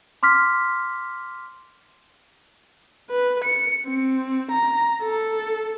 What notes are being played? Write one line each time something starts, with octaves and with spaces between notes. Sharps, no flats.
C6 D6 F6 B6
B4
C#7
C4
A#5
A4